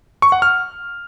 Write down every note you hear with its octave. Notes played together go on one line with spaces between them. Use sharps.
C#6
F#5
F6